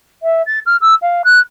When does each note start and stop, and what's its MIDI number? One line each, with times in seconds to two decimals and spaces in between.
0.22 0.42 76
0.46 0.59 93
0.66 0.76 89
0.81 0.94 88
1.02 1.22 77
1.24 1.39 90